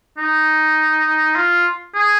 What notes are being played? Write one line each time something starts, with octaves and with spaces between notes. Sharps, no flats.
D#4
F4
G#4